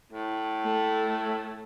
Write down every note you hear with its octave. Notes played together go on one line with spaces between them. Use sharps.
A2
A3